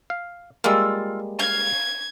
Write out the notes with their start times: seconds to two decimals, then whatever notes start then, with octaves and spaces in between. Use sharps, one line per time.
0.10 F5
0.64 G3 G#3 A#3 F4 E6
1.39 F5 G#6